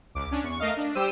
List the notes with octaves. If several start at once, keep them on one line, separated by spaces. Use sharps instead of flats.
C#2 D6 D7
C#4 D4
E2 C#6
A3 A#4 D#5 F5
D4
G3 G4 C5 G5 E6 D#7